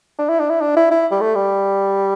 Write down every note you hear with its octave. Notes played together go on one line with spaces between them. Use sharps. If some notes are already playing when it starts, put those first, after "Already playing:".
D4
E4
D4
E4
D4
E4
E4
G3
A3
G3